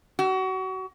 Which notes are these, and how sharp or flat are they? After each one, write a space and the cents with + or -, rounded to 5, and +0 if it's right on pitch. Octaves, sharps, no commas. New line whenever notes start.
F#4 +30